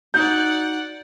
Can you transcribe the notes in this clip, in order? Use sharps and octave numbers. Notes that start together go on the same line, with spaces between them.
D#4 F#4 D5 F#5 G6